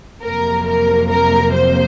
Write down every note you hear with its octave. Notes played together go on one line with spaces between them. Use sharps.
F2 C3 F#3 A#3 A#4
A#4
A#4
C5